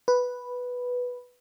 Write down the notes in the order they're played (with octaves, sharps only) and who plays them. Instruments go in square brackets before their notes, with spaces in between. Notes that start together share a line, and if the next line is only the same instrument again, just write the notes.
[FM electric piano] B4